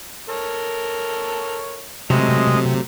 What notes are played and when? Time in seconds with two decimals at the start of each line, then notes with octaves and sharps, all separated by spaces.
0.29 A4 A#4 C#5
2.10 C3 F#3 G#3 A3 D#5